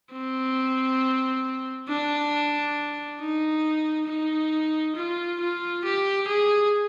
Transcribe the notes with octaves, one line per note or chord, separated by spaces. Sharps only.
C4
D4
D#4
D#4
F4
F4
G4
G#4